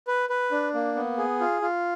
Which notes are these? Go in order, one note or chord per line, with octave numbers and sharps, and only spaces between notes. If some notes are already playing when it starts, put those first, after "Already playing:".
B4
B4
D4
A#3
B3
G#4
F4
F4